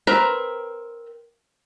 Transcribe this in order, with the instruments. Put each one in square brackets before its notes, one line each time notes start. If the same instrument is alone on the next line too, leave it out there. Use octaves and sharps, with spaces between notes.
[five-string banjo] C4 A#4 B4 A#5